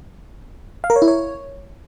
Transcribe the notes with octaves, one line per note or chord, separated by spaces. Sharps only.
F5
A#4
C#5
E4
C#5